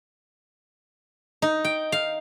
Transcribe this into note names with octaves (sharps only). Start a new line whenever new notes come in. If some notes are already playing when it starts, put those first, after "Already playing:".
D#4
G5
F5